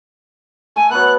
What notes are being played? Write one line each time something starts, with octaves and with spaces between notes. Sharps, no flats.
A3 G#5
F#3 B3 F#6